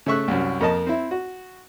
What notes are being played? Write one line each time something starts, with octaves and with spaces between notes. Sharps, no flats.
C#3 A3 E5 C#6 F#6
C2 F#2
F2 A#3 A#4 D#5 A5
C4 E4
F#4